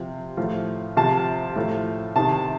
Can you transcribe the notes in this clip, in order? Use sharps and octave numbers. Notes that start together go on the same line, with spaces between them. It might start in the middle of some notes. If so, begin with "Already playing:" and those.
Already playing: C3 F3
A2 F3
C3 F3 A5
A2 F3
C3 D#3 A5